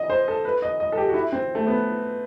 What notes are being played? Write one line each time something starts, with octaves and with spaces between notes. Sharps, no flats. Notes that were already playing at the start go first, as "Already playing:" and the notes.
Already playing: D#5
C5
A4
B4
D#5
D#5
A4
G4
F#4
E4
C4
A3
B3